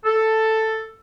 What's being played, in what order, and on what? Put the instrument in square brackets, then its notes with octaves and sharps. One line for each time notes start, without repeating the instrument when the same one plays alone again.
[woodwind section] A4